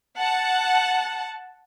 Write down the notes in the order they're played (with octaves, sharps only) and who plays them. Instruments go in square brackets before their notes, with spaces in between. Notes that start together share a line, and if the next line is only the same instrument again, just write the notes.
[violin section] F#5 A5